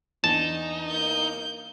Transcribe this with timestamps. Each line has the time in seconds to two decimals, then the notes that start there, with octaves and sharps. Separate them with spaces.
0.24 E2 D4 D#4 A5
0.88 A#3 G6